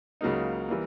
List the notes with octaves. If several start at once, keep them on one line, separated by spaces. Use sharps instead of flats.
C#2 C#3 F#3 A#3 D#4
E3 G3 A#3